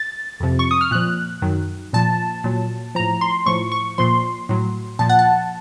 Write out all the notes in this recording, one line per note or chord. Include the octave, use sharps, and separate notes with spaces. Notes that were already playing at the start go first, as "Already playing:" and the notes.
Already playing: A6
F2 C3 F3
C#6
D#6
F6
A#2 F3 F#6
F#2 D#3 F#3
A#2 F3 A5
A#2 F#3
A2 F3 A#5
C6
A2 F3 C#6
C#6
A#2 F3 C6
A2 F#3
A#2 F3 A5
F#5
A5